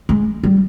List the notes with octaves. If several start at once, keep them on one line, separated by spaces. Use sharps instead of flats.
G#3
G3